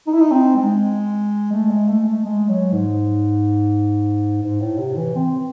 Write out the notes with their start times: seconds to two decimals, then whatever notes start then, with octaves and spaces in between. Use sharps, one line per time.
0.07 D#4
0.14 E4
0.21 D#4
0.32 C4
0.56 G#3
1.53 A3
1.70 G#3
1.89 A3
2.06 A3
2.25 G#3
2.49 F#3
2.73 G#2
4.43 G#2
4.61 A2
4.79 C3
4.97 E3
5.16 C4